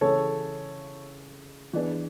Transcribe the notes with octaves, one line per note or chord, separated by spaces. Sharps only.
C#3 E3 A3 E4 G#4 A4 C#5
E3 B3 D4 G#4